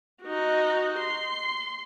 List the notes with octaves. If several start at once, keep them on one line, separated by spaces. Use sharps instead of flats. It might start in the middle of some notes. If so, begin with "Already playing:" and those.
D#4 F#4
C6